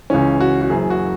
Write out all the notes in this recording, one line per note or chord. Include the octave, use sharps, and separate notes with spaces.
C#2 C#3 E3 C#4
F#4
F#4
F#1 F#2 E3 G#4
F#4